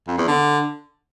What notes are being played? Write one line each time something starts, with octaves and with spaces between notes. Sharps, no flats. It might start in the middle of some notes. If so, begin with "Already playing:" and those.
F2
E2
D3